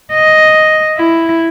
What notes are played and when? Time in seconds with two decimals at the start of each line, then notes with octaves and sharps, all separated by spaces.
0.13 D#5
0.98 E4